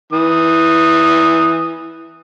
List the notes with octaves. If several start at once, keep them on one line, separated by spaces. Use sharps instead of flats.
E3 D#6